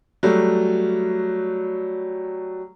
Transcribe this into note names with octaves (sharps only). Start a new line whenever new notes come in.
F#3 G3 A3